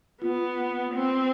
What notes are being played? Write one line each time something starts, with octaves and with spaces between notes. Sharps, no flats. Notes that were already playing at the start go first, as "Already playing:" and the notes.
B3 F4
C4